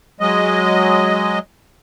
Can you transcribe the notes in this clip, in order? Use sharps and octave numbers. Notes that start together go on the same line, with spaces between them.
F#3 G#3 D#5